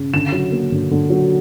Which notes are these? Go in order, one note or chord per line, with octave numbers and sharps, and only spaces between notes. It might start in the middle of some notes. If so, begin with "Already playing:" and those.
Already playing: C#3
D3 E7
F#3
A#3
D3
D3
F#3